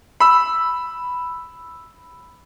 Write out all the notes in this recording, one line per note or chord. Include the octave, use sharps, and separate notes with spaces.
B5 E6